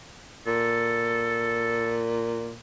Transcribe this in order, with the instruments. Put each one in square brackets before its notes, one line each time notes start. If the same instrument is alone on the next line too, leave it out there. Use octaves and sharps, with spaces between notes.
[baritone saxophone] A#2 [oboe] A4